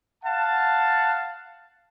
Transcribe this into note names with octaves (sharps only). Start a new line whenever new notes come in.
F5 F#5 A5